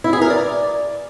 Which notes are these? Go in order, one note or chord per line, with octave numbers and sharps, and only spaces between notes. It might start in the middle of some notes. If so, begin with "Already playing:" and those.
E4
G#4
A#4
D5